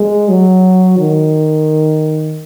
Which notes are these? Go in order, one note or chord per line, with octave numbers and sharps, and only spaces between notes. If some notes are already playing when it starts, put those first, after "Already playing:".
Already playing: G#3
F#3
D#3